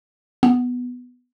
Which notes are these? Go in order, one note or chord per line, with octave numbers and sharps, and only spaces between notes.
B3